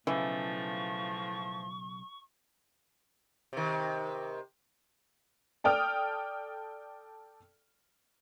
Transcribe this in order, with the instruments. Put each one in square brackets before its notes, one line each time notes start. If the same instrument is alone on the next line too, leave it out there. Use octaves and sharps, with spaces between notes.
[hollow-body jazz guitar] B1 C#3 [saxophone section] A2 F3 [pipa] E3 [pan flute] C#6
[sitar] C3 D#3
[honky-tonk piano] A4 D5 G5 D#6 F6